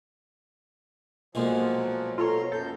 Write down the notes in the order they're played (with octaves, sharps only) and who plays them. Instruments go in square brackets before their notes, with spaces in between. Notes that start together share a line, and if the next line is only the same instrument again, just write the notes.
[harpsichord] B1 A#2 G#3 [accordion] F3 F#3
[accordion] B2 A#5 C6 [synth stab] F4 A4 C#5
[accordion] F#2 B2 G6 [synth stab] A4